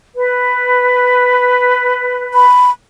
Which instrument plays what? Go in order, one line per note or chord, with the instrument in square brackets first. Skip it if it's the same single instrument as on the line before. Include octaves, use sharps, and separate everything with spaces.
[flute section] B4
[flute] B5